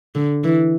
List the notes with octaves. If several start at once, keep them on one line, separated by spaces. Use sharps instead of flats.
D3
E3